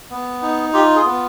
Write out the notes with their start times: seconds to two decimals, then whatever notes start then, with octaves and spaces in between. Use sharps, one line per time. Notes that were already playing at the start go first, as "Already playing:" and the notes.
0.10 B3
0.42 D#4
0.73 F4 G4
0.95 G#4
1.05 B3